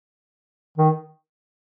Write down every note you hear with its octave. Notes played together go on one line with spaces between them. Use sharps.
D#3